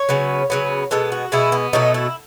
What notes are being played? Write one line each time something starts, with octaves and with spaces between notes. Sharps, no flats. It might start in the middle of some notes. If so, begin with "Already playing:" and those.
Already playing: C#5
C#3 F#3 B3
C#3 F#3 B3
B2 G#3 B3 A4
F#4
B2 G#3 B3 E4
B3
B2 F#3 A3 D#4
E4